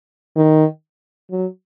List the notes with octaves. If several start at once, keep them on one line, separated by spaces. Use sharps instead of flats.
D#3
F#3